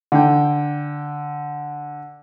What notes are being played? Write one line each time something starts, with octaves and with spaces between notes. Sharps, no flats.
D3 G5